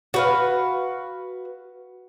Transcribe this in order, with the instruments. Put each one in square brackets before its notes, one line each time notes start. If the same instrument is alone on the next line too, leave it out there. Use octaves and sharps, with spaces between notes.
[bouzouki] F#4 B4 F5